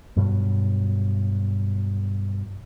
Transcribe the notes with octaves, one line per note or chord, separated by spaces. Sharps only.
G2 B2 F#3